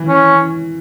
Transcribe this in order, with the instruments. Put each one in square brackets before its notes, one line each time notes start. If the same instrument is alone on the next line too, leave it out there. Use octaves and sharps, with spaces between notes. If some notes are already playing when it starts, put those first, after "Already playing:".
Already playing: [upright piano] E3
[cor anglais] C#4